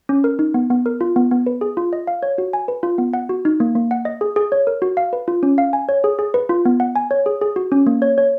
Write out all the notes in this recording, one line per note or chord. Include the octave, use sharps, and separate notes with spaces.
C#4
A#4
D#4
B3
B3
A#4
F4
B3
B3
B4
G#4
F4
D#5
F5
C#5
F#4
G#5
B4
F4
B3
F#5
F#4
D#4
A#3
A#3
F#5
D#5
G#4
G#4
C#5
A#4
F#4
F5
B4
F4
C#4
F5
G#5
C#5
G#4
G#4
B4
F4
B3
F#5
G#5
C#5
G#4
G#4
F#4
C#4
A#3
C#5
C#5